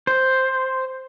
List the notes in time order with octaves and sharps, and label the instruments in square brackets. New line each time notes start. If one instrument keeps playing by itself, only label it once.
[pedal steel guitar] C5